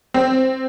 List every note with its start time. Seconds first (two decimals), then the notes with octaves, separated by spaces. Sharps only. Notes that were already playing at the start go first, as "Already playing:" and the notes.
0.14 C4